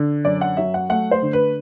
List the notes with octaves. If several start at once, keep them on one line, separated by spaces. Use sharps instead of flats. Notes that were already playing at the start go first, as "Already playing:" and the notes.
Already playing: D3
F#2 D5
F#5
F#3 E5
F#5
A3 F#5
C5
D3
B4